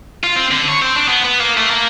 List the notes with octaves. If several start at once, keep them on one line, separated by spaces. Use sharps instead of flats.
F4
C4
D3
C#5
C4
D4
B3
B3
A#3
A3
A#3